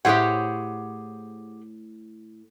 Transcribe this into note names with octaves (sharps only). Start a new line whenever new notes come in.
A2 G4 G#4 C5 C#5 F#5